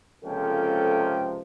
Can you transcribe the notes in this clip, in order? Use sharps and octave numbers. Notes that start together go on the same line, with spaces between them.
C#2 C3 F3 A#3 C#4 A4 G5